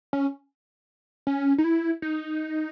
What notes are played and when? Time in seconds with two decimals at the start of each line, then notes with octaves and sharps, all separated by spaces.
0.13 C#4
1.27 C#4
1.58 D#4
1.64 E4
2.02 D#4